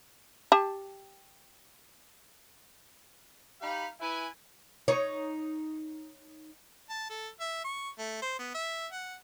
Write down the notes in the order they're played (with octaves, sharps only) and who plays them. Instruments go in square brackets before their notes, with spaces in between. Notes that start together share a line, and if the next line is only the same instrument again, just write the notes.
[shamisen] G4 A5
[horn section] D#4 G4 F5 B5
E4 B4 G#5
[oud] D#4 C#5
[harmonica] A5
A4
E5
C#6
A3
C5
B3
E5
F#5